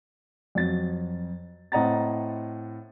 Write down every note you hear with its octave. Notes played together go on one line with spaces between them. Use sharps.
F2 F#3 A6
A2 C4 D#5 F#5 A#5 A6